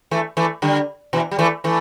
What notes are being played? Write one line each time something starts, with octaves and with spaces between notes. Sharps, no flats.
E3 A3
E3 A3
D3 G3
B2 E3
G3
E3 A3
E3 A3